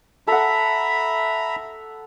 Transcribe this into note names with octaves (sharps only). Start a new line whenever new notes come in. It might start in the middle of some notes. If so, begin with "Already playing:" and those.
A4 E5 F#5 A#5 B5